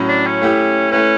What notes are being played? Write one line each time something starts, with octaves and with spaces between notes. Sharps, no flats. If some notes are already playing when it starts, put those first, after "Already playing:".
Already playing: A2 F#3 C#4
D4
C#4
A3 E4 G4
A3 C#4 E4 B4